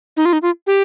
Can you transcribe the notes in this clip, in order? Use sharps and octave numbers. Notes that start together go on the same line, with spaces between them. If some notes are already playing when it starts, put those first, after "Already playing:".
D#4
F4
D#4
F4
G4